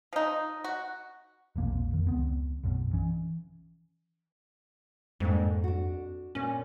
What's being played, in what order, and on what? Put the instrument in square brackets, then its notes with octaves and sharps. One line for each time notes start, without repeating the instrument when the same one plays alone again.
[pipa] F3 D#4
F#4
[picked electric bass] E1 A#1 A#3 C4
F2 D#3
C#2 B3 C4
B1 F#2 B2
E3 C#4
[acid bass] F2 [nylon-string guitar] G#2 A#3 D4
[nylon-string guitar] D4 F#4
[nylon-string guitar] A#2 C#5 [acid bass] C#4